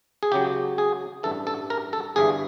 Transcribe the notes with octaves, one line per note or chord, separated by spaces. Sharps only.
G#4
C#2 C#3 F#3 G4
G#4
A1 G2 E3 A4
A4
A#4
A4
G1 G2 E3 G#4